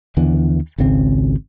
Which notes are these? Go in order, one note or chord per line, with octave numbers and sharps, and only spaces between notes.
D#2 D3 E3 B3
G#1 C#2 C#3 C4